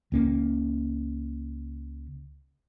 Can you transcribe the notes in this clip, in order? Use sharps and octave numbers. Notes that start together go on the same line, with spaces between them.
C#2 A#3 C#4